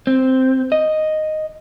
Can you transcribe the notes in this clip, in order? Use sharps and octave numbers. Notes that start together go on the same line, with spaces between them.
C4
D#5